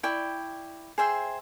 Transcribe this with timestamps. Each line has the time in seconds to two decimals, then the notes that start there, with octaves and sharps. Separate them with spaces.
0.03 E4 D5 G5 C#6
0.98 G#4 C5 E5 G5